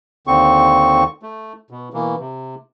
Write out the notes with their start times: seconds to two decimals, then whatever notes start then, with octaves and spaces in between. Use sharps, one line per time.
0.27 D#2 D3 C4 C#6
1.23 A3
1.70 B2
1.94 B2 E3 A#3
2.18 C3